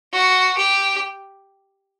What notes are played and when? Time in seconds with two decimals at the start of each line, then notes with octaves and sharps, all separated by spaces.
0.13 F#4
0.57 G4